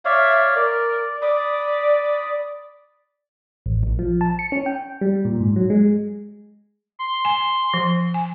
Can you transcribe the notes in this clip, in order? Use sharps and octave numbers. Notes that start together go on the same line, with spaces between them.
C#5 D5 E5 F5
A#4 D5
D5 B5 D#6
A1
A#1
F3
A5
C#7
C#4
G5
G3
A#2
G#2
F#3
G#3
C6
G#5
F3
G#5